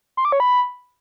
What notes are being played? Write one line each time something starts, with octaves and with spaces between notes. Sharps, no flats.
C6
D6
C#5
B5